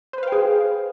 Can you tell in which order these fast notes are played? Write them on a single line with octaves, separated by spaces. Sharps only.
C5 B4 F5 G5 G#4